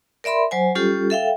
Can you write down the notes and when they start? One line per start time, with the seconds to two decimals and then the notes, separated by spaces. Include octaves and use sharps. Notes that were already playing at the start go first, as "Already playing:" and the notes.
0.24 A#4 D5 E5 B5 C6
0.51 F#3 C5 G#5
0.75 G3 C#4 F4 G4 A4
1.10 A4 E5 F5 G5